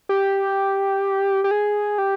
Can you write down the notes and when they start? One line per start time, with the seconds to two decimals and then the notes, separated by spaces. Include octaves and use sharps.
0.09 G4
1.44 G4
1.51 G#4
1.98 G4